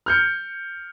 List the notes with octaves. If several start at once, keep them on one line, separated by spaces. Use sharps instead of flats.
F6 G6 C#7